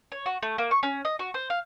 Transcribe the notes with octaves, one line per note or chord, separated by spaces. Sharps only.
C#5
F#4
A3
A#3
C#6
C#4
D#5
F#4
C5
F5